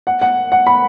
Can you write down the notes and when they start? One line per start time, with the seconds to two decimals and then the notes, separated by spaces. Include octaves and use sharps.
0.07 F#5
0.21 F#5
0.52 F#5
0.67 B5